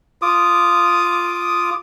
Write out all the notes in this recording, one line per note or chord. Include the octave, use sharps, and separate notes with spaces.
F4 D6 D#6